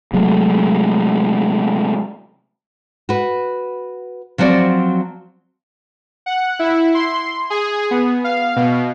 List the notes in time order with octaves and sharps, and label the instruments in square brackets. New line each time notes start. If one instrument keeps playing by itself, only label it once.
[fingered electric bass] C3 F#3 G#3 A3
[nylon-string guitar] F#4 B4
F3 F#3 C4 F#4 D5
[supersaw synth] F#5
E4
C6
G#4
B3
F5
B2